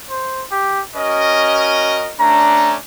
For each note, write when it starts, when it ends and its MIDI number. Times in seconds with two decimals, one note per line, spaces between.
0.10 0.45 72
0.51 0.82 67
0.96 2.08 61
0.96 2.12 66
0.96 2.12 70
0.96 2.12 75
2.20 2.76 57
2.20 2.76 61
2.20 2.76 62
2.20 2.75 82